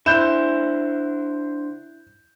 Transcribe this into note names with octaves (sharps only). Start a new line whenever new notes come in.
D3 D4 E4 C5 F#6 G6 E7